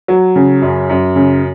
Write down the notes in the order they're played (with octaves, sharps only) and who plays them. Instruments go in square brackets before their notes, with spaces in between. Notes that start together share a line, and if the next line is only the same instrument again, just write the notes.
[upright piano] F#3
C#3
F#2
F#2
C#3